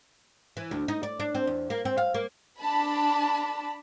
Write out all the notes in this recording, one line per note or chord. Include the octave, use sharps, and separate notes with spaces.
E3
D2
D#4
D5
D4
C4
E2
A#3
C4
F5
A#3
D4 A5 B5